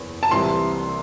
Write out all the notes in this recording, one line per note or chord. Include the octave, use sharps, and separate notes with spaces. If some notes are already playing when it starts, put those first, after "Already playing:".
Already playing: F#1 E2
A5
C2 C3 E3 C6